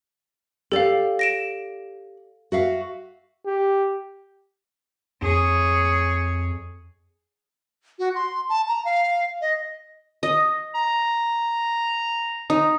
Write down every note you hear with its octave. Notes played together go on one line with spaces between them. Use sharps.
G4 A4 D5 F5
A#6 D7 E7
F#4 E5 F5
G4
F2 G#4 C#5
F#4
C6
A5
A#5
F5
D#5
D#5
A#5
D#4